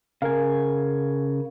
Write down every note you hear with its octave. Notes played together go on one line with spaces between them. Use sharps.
C#3 A#4 F5 G#5